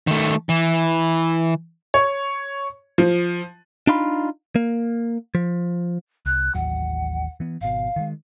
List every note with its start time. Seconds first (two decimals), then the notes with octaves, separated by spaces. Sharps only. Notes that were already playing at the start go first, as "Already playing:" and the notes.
0.07 D#3 A3
0.49 E3
1.94 C#5
2.98 F3
3.87 D4 D#4 F4 B5
4.56 A#3
5.35 F3
6.26 C2 F#6
6.55 A1 D#2 F#3 F#5
7.40 E3 B3
7.61 G#1 B2 F5
7.96 D#3 E3 G#3